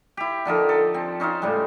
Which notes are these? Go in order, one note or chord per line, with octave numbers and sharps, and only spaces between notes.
E4 G4
D3 F3 D#4 A#4
A4
C4
C#4 D#4 C5 F5
A2 C#3 G3 G#3